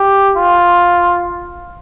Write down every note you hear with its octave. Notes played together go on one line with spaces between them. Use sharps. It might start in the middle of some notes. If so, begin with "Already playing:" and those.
Already playing: G4
F4